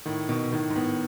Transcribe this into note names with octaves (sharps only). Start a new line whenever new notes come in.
A2 D#3
B2 D#3
B2
A2 D#3
G#2
A2 B3